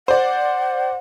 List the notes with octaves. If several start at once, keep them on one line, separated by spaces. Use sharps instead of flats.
C5 D5 F#5